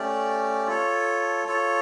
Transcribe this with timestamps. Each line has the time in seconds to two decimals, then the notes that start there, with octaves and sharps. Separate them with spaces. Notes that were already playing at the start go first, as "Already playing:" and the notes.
Already playing: A3 C#4 G4 D5
0.67 F4 A4 C#5
1.47 F4 A4 C#5